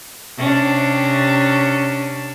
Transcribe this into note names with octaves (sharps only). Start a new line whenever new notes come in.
C3 C#4 D4